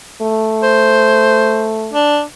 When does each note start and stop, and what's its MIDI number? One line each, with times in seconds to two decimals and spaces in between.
0.22 1.94 57
0.63 1.78 72
1.93 2.23 62